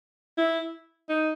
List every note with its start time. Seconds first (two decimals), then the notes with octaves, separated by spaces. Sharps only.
0.38 E4
1.09 D#4